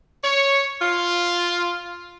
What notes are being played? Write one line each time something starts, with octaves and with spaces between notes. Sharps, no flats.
C#5
F4